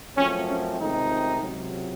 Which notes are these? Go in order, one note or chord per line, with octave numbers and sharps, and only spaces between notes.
F#2 F3 A3 C4 C#4
C#4
C#2 C3 D#3 A3 C4 D#4
C#2 C3 F#3